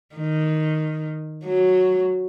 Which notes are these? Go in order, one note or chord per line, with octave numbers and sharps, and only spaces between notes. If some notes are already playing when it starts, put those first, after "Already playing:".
D#3
F#3